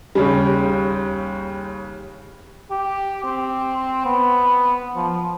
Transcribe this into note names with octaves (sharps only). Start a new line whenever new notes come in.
D#2 C#3 G3
G4
C4
B3
F3